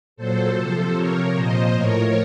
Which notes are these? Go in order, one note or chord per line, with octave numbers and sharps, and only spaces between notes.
A#2 F#3 A4 C5
C3 F3
C3 F3 A#4 C#5
A#2 F3 C5 D#5
A2 F3 A#4 C#5